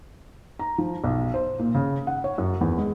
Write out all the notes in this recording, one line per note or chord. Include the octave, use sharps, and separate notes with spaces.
A#5
F3
B1
C5
A#2
C#3
F#5
C#5
F#2
E2
G#3